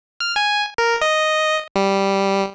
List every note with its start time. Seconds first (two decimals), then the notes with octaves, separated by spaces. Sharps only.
0.20 F6
0.36 G#5
0.78 A#4
1.01 D#5
1.76 G3